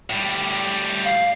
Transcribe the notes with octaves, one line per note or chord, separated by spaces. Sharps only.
A2 G3
F5